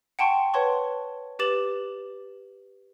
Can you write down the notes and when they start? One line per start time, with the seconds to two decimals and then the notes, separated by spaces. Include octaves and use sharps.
0.19 F#5 G5 A5 C6 C#6
0.54 B4 C#5 F#5 A5 C6 C#6
1.39 G4 B4 D6 A6 E7 F#7